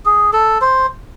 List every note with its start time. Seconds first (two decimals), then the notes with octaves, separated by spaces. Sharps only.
0.06 G#4
0.33 A4
0.61 C5